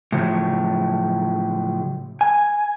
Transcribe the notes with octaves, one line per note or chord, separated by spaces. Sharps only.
A2 C#3 F3 F#3
G#5